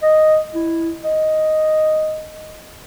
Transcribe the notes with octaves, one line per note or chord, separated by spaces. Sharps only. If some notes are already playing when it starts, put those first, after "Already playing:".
D#5
E4
D#5